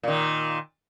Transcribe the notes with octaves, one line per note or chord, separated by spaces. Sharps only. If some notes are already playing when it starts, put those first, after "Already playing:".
A#2 D#3